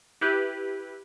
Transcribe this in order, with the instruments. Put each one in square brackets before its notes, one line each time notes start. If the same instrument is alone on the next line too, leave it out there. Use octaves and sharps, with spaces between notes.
[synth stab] E4 G4 B4